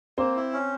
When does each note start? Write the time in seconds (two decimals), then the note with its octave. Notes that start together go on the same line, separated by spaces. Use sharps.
0.18 A#3 C4 C5
0.36 E4
0.53 C#4